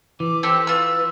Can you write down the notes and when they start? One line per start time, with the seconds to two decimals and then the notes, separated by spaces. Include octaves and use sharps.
0.20 E3 D6
0.43 C4 G4 A4
0.67 F4 B4 E6